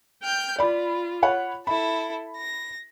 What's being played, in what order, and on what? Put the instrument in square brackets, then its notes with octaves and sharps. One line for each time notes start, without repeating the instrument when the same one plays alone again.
[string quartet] G5 F6 G6
[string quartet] F4 [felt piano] D5 B5
[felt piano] C#5 F#5 B5
[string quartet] E4 A4 [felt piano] B5
[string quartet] A#6